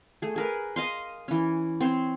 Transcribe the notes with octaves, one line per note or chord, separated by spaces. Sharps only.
A3 G#4
G#4 A#4 B4
D#5 F5 C6
E3 C#4
C4 C5 C#5